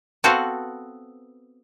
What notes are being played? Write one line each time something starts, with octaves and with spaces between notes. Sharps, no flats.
B3 C4 F#4 A4 F5